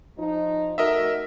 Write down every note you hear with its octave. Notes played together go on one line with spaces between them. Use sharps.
F3 D#4
A3 D#4 F#4 A#4 D#5 E5